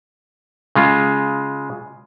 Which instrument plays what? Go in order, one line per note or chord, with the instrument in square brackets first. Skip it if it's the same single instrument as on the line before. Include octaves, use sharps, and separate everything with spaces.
[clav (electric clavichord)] C#3 G#3 F4